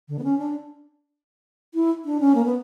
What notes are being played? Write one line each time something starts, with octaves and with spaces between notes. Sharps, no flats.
D3
B3
C#4
D4
E4
D4
C#4
A#3
B3